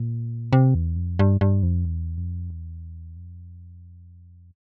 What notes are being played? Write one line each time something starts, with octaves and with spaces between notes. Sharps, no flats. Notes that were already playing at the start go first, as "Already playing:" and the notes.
Already playing: A#2
C3
E2
F2
G2
G2
F2
E2
F2
E2
F2